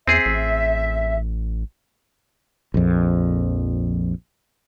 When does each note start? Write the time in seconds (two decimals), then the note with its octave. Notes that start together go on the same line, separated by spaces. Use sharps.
0.08 E2 C4 G#4 E5
0.26 A1
2.74 A#1 F2